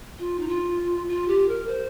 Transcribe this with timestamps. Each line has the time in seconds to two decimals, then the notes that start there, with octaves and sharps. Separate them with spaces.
0.19 F4
0.39 D#4
0.48 F4
1.09 F4
1.28 G4
1.48 A#4
1.68 C5